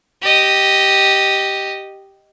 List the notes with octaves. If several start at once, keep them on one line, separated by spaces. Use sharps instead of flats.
G4 D#5